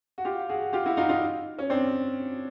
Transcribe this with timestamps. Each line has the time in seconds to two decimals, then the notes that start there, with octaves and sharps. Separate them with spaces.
0.18 F#4
0.25 F4 G4
0.49 F#4 G#4
0.73 F4 G4
0.85 E4 F#4
0.97 D#4 F4
1.09 D#4 F4
1.59 C#4
1.70 C4 D4